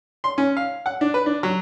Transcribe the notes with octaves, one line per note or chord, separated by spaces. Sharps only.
C6
C#4
F5
F#5
D4
B4
D4
F#3